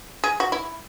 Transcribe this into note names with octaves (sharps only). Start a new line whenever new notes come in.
G#4
F#4
E4